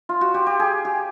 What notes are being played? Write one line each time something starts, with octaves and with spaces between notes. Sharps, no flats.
F4
F#4
G4
G4
G#4
G4